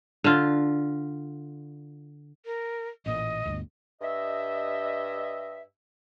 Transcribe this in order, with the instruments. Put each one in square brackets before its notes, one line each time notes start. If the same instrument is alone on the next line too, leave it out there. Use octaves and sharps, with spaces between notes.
[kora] D3 F4
[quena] A#4
[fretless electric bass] A1 A#2 [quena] D#5
[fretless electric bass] G1 D2
[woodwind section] G2 D#5 E5